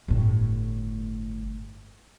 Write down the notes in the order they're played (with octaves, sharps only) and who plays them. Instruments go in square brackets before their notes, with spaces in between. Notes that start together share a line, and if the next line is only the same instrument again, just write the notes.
[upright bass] G1 A2